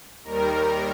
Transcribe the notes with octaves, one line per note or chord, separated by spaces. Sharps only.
D#2 D#3 G3 A#4